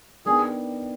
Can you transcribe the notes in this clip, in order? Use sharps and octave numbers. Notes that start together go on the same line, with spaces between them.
D#3 G3 B3 D4 G4 G#4